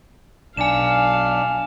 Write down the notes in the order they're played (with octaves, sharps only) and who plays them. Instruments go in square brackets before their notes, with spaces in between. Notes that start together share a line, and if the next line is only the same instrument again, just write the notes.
[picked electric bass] B1 [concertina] D4 [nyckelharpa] F5 [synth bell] G#5 E7